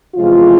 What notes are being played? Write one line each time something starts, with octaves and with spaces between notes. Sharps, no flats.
E2 C3 F3 G#3 F4